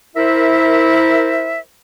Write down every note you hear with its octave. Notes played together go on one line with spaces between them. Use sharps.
E4 A#4 C5 E5